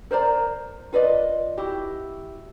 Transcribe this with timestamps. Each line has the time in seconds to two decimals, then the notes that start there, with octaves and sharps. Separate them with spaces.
0.11 A#4 C5 D5 A#5
0.93 F4 B4 D5 D#5
1.58 E4 F#4 G4